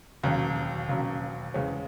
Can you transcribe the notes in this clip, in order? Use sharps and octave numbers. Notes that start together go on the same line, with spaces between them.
E1 D#2 C#3 F#3
E1 D#2 C#3 F#3
E2 C#3 G#3 C#4